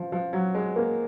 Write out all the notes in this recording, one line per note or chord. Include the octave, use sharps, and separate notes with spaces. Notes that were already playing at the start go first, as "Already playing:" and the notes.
Already playing: F3
F3
F#3
G#3
A#3